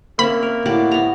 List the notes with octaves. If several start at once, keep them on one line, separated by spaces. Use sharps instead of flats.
A#3 C4 C#4 E5 B5
A#4
A2 F#4 G4 D5
B3 A#5